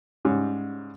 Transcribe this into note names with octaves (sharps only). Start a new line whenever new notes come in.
G#2 C#3 G3